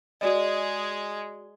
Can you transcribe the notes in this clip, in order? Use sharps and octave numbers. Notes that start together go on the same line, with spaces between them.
G#3 F#4 G#4 D5 D#5